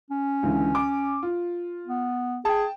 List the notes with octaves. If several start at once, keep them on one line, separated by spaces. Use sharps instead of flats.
C#4
C#2 D3 E3
D6
F4
B3
G#4 G5 A5